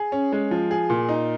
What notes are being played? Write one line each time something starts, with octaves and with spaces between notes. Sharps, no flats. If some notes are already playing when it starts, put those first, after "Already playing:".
Already playing: G#4
C#4
G#3
F3
G#4
A#2
D#4